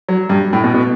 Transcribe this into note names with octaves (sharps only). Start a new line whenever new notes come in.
F#3
G2
A2
B2
B2